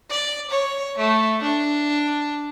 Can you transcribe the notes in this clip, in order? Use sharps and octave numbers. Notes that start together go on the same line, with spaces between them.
D5
C#5
A3
D4